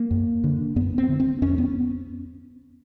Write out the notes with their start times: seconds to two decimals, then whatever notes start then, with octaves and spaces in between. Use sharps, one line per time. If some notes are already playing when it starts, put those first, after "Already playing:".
Already playing: A#3
0.11 F#2
0.44 D3
0.76 F#2 B3
0.98 C4
1.09 D3
1.20 C4
1.42 F2 C#4
1.58 B3